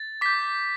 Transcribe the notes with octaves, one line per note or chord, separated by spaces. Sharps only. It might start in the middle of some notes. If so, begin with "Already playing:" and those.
Already playing: A6
D6 G6 B6